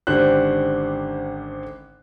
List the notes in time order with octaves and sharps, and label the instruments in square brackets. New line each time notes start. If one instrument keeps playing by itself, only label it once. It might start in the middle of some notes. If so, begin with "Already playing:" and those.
[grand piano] G#1 D3 C#4 G4 C5 F#6